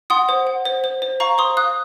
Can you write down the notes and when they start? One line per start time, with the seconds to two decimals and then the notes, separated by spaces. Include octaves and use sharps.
0.10 F#5 C6 D#6
0.29 C5
0.47 F#5
0.65 C5
0.84 C5
1.02 C5
1.20 F5 A#5 C#6
1.38 C5 C6 D#6
1.57 F5 D#6 F#6